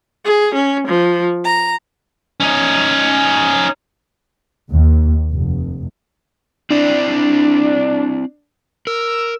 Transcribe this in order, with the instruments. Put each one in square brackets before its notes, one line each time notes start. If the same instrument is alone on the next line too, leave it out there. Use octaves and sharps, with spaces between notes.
[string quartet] G#4
C#4
F3
A#5
[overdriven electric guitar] C#4 D#4
[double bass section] D#2
F1
[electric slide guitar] C4 E4 D5 [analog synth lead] D4
[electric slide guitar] A#4 [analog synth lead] E6